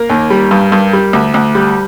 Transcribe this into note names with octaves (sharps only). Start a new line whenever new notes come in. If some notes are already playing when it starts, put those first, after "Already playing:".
Already playing: A#3 A#4
D#2
G3
G2
G2
G3
D2
D2
G3